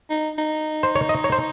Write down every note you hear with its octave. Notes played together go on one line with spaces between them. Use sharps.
D#4
D#4
C5
C#5
D#5
C#5
C5